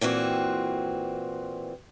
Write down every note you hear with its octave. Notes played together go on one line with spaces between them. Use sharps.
A#2 E3 C4 F#4